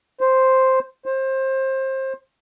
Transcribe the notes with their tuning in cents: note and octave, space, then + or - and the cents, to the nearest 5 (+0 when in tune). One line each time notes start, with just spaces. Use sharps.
C5 +0
C5 +25